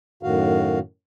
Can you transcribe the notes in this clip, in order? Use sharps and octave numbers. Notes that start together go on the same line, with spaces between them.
F#2 A2 D#3 F#4 F5